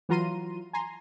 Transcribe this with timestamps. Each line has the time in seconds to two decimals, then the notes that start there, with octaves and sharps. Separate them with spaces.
0.09 E3 F#3 F4 A#5 C6 D#7
0.73 G#5 A#5 C6